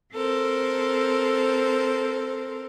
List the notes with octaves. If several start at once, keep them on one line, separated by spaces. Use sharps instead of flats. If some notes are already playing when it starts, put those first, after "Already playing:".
C4 A4 A#4 C5